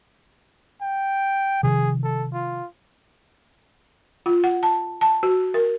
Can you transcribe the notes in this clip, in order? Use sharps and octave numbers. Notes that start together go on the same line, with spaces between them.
G5
C3 D#3 F3 G#4
A4
F4
F4
F#5
A5
A5
F#4
A#4